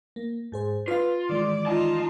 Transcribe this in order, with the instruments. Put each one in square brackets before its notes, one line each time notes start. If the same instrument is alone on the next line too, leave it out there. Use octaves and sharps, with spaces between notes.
[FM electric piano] A#3
G#2 G#4 C5
[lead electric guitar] F4 [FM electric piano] B4 F5
[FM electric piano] D#3 E3 G#3 [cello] D5
[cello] D#4 F4 [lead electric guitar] A5